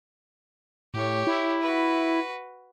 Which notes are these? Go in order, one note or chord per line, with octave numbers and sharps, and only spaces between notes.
A2 G4 C#5
E4
F#4 B4